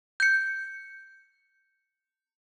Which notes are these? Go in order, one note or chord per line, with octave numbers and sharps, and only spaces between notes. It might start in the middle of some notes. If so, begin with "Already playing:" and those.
G6 C#7